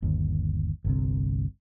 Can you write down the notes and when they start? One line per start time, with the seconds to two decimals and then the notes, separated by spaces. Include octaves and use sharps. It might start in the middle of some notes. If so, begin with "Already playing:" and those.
0.02 G1 D#2
0.85 G1 C2 C3